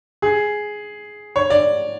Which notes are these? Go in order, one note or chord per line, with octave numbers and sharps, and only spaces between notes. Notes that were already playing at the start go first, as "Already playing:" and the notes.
G#4
C#5
D5